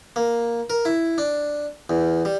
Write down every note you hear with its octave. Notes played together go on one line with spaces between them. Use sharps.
A#3
A#4
E4
D4
E2
G3